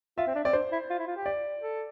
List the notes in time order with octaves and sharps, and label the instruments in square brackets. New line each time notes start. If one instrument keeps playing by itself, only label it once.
[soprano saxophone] F4 [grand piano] E5
[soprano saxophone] C4
D4
[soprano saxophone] C4 [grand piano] D5
[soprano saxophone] D4 [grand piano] C5
[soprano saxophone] E4
F4
E4
F4
G4
[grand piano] D5
[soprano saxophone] A4